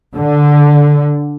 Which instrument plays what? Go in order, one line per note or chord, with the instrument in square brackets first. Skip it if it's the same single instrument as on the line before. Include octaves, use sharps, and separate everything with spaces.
[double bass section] D3